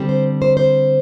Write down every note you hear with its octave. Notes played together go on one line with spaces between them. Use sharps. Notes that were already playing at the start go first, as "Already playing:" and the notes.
Already playing: D3 G3 C4
C5
C5
C5